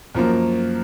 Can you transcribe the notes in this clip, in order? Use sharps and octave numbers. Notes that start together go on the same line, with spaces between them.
F#2 F3 A#3